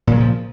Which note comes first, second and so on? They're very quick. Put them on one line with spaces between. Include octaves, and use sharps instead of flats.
A#2 F#3 C#3 F3